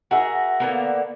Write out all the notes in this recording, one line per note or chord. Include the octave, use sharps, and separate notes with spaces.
F#4 G#4 A#4 E5
D3 A#3 B3